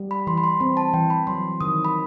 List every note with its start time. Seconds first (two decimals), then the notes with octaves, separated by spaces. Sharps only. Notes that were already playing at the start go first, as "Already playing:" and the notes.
Already playing: G3
0.11 B5
0.27 E3 C6
0.38 B5
0.44 C6
0.60 C4 B5
0.77 A5
0.93 E3 G5
1.10 B5
1.27 F#3 C6
1.61 D#3 D#6
1.85 B5